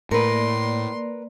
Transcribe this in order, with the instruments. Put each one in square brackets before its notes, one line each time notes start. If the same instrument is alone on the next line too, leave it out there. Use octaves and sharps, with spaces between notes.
[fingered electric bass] A2 [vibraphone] A#3 D5 [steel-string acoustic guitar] A#4 B4 [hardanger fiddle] C6